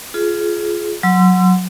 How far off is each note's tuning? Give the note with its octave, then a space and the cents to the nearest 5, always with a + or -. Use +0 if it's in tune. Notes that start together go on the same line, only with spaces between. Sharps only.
F4 -5 G#4 +20
F#3 -10 C6 -20 E6 +35